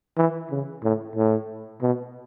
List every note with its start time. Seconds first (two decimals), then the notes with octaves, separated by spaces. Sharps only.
0.17 E3
0.50 C#3
0.83 A2
1.16 A2
1.82 B2